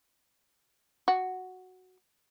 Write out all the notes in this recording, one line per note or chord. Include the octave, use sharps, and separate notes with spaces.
F#4